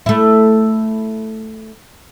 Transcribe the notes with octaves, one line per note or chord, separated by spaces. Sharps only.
A3 E4